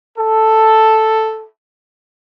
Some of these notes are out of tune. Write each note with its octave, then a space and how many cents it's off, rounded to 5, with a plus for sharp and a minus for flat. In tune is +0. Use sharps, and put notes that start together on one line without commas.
A4 +0